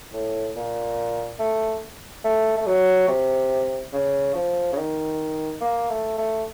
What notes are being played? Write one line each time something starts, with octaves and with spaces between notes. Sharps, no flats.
A2
A#2
A3
A3
A3
F#3
C3
C#3
F3
C#3
D#3
A#3
A3
A3